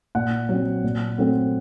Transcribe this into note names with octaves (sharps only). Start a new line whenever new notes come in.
A#2 F#5
F#3 C4
A#2
F#3 A3 C4